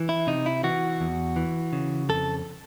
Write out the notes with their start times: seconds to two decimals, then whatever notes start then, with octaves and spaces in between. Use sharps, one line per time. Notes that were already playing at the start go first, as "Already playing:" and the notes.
Already playing: E3
0.09 E4
0.27 C3 D#4
0.46 E4
0.64 E3 F#4
1.01 E2
1.36 E3
1.73 C#3
2.09 F2 A4